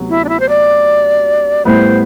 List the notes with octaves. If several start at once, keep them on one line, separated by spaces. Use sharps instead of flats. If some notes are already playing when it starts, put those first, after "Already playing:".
Already playing: D2 C3 F#3 B3
E4
D4
E4
C5
D5
A2 G3 B3 E4 B4 C5